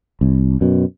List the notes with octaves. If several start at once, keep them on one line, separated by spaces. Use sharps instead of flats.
C2
F#2 B2